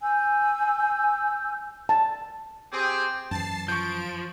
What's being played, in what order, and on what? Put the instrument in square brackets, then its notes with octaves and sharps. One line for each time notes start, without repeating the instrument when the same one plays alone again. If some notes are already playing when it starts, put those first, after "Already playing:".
[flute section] G#5 E6 G6
[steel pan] A5
[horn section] C4 G4 G#4
[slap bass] F#2 E3 [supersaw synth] A5 A6 C7
[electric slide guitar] F3 [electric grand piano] C#6 G6 [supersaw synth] D7